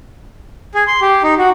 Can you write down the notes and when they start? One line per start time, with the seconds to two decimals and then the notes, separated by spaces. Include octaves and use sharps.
0.75 G#4
0.87 C6
1.01 G4
1.23 D#4
1.38 F#4